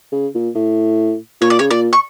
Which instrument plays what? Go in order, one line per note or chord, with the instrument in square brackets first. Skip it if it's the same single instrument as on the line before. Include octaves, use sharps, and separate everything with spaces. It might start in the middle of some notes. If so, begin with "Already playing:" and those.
[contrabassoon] C#3
A#2
A2
[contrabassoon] A#2 [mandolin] C#5
[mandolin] D5
[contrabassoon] C#3 [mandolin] C#5
[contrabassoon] A#2 [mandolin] D5
[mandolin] C#6